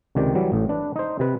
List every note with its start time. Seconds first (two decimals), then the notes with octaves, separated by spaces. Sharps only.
0.15 C#2 C3 D#3 D5 G5
0.35 E3 F#3 G3
0.52 A1 A2
0.69 D4 B4
0.96 D#4 C5
1.19 C3 B4